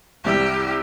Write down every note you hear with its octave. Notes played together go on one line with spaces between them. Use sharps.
C2 C3 G3 G4